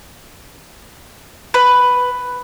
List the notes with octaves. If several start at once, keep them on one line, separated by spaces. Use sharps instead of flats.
B4